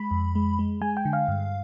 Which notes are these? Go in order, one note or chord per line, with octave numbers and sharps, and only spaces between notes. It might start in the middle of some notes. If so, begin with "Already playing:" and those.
Already playing: G#3 B5
F2
G#3
G#3
G#3 G#5
G5
D3
F5
G2